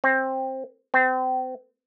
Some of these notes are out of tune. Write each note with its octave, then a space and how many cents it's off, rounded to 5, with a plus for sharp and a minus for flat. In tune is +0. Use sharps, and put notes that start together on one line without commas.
C4 +15
C4 -30